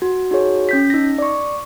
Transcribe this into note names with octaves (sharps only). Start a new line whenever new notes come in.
F#4
D#4 F#4 G#4 C#5
C#4 G6 B6
D#4 A#6
D5 C#6